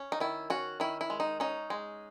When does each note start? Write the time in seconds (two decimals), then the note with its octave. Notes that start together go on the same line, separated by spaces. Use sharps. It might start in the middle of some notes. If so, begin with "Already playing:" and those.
Already playing: C#4
0.12 D#4
0.20 D#3 E4
0.50 C#4 F#4
0.80 D#3 E4
1.01 E4
1.10 G#3
1.20 D#4
1.40 C#4 D#4
1.70 G#3